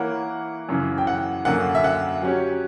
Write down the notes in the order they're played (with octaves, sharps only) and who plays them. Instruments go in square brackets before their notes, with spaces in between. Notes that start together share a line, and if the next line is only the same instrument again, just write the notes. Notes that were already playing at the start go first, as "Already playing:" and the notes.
Already playing: [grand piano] E3 A#3 E4 A#4 C#5 [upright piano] F#5
[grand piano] F#2 C#3 E3
[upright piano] G5
F#5
[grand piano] F#2 D3 A#3 [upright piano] F#5
[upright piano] E5
F#5
[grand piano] F#3 C#4 G4